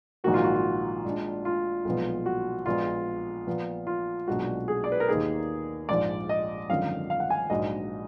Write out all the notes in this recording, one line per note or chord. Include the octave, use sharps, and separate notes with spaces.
A#1 G#2 D#3 F#3 A#3 F#4
F4
F#4
F4
A#2 G#3 D4
F4
B1 A#2 F3 G#3 B3
F#4
A#1 A#2 G#3 B3 F4
A#2 F3 B3
F4
B1 A#2 G#3 D4 F#4
G#4
D5
B4
A#4
D#2 D#3 A#3 D#4 G#4
A#1 G#2 F3 D5
D#5
G#1 F#2 D3 F3 F5
F5
F#5
G#5
A#1 G#2 F#3 D4 D#5